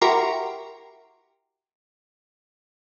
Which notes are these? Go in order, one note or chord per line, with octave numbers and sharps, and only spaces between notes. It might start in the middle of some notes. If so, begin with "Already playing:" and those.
E4 F#4 G4 A#4 A#5 C6